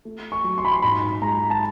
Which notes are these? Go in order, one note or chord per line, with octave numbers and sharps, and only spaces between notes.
A3
C#6
F#3
C6
B5
C6
G#2 B5
G#3 A#5
A5